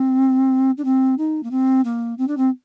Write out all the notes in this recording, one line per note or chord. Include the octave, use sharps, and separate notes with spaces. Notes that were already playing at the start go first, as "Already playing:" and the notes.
Already playing: C4
D4
C4
D#4
A#3
C4
A#3
C4
D4
C4